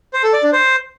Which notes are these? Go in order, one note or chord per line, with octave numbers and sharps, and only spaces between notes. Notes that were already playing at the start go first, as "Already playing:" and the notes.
C5
A4
D5
D4
C5